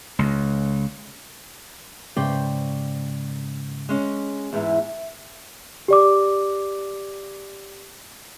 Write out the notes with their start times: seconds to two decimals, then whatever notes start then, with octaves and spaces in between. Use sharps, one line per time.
0.19 C#2
2.17 G#2 C#3 C5 D5 G5
3.89 G#3 C#4
4.53 E2 G#2 E4
5.88 G4 D5 D6